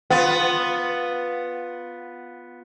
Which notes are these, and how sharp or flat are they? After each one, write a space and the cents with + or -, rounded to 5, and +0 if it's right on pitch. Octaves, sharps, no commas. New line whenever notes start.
B3 +0 F4 +10